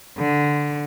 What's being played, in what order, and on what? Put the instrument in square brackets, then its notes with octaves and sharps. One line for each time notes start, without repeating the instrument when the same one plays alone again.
[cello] D3